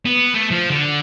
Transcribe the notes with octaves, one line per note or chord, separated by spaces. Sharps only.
B3
A3
F3
D3